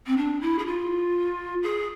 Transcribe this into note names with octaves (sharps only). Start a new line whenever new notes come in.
C4
D4
E4
G#4
F4
G#4